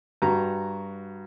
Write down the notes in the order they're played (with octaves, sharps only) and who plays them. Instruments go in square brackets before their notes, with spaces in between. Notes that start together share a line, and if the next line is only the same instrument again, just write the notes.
[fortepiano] G2 F#4 A#5